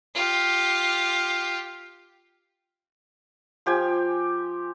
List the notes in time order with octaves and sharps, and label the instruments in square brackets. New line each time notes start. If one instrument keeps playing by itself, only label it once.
[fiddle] F4 G4
[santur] F3 G4 G5 G#5